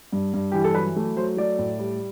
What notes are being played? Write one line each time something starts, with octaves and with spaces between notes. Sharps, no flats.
G2
G2
E3 G4
A4
F#3 B4
A3
F#3 C5
A3 D5
A2
G3